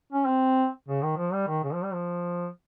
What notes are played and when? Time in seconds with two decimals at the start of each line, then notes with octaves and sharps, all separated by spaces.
0.12 C#4
0.27 C4
0.88 C#3
1.03 D#3
1.17 F3
1.33 G3
1.48 D#3
1.64 C#3
1.73 F3
1.83 G3
1.93 F3